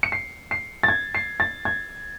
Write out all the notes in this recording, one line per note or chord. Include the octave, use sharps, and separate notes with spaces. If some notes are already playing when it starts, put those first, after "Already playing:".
C#7
C7
C7
A6
G#6
C7
A6
G#6